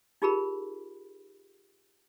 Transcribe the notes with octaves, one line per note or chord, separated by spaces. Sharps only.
D#4 F4 G4 G#4 A#4 B5